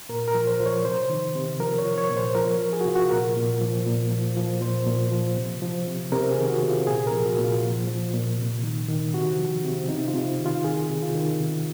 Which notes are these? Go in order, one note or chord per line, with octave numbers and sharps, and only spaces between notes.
A#2 A#4
A#4
F3
C5
F3
C#5
C3 C5
D#3
C3
F3 A#4
C#5
F3
C#5
A#2
C5
F3 A#4
F3
G#4
F#4
C3 F4
F#4
A#2 A#4
A#2
F3
A#2
F3
F3
A#2 C5
A#2
F3
C3
F3
C3
C3 A#4
G#4
D#3
F#4
C3
F4
A#2 G#4
A#4
F3
F#4
A#2
F4
F3
F3
A#2
C3
D#3
D#3
C3 F#4
F3
C3
C3 D#4
F4
C3
D#3
F4
D#3 G#4
C3
F4
D#3
C3